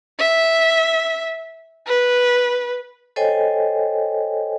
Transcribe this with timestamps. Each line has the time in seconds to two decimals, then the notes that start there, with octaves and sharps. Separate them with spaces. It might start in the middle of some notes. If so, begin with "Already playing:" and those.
0.19 E5
1.87 B4
3.16 A4 C5 C#5 D#5 G5 G#5